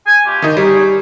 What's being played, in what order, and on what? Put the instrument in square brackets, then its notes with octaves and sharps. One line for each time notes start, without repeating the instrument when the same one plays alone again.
[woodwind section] G#5
B2 F4 G4
[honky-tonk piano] D#3 D#4
[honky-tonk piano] G3 [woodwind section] C#4 D#4 G#4